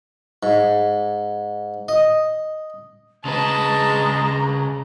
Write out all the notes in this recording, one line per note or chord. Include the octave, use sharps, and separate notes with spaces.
G#2
D#5
C#3 G#3 B4 A5 A#5